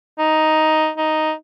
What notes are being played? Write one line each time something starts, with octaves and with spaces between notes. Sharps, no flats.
D#4
D#4